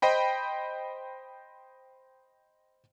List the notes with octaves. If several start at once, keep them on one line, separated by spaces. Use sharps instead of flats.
C5 D#5 G5 B5